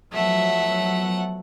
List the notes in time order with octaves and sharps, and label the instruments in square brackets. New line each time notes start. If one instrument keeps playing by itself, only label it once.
[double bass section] F3 F#3 B3 [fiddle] A3 F#5 [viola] E5